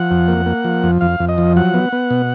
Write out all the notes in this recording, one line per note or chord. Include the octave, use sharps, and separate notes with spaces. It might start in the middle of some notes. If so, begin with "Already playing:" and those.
Already playing: F3 F#5
F2
A#3
A#3
F3
F2
F2 F5
F2
D#5
F3
F#3 F#5
B3
B3
B2